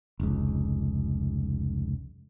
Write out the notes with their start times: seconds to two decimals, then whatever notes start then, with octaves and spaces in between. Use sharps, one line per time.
0.20 F1 C#2